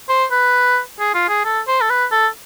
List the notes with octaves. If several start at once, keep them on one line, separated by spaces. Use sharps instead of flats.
C5
B4
G#4
F4
G#4
A4
C5
A4
B4
A4